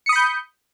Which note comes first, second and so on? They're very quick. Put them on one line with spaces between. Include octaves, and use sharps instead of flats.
C#7 D#6 B5 G6